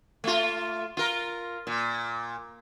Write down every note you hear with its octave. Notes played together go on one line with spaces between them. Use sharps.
A3 F4
F4 A#4
A#2